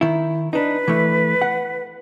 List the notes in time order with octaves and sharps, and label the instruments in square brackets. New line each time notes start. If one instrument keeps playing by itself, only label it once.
[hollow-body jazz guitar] D#3 E4
[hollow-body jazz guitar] D4 D#4 [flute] B4
[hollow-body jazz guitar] E3 A3
F#5